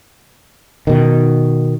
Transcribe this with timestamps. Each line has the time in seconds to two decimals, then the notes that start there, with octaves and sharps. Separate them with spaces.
0.87 B2 D#3